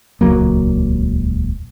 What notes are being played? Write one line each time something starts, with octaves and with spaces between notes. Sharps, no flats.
D#1 C#2 F#3 A#3